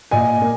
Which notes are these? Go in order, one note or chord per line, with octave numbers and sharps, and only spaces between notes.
A#2 D#5 G#5
A#3